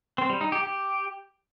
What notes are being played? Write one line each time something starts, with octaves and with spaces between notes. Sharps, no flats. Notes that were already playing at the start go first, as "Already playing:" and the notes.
C4
G3
D#4
G4
G4